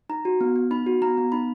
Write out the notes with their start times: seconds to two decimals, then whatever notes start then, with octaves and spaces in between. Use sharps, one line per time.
0.09 D#4 A#5
0.25 F#4
0.41 B3
0.56 B3
0.71 D#4 B5
0.86 F#4
1.02 B3 A#5
1.17 B3
1.32 D#4 B5